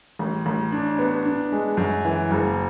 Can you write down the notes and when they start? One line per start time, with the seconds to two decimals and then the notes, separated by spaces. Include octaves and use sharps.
0.19 A1
0.46 A1
0.72 D4
0.99 B3
1.26 D4
1.52 G#3
1.77 F#2
2.05 E3
2.31 F#1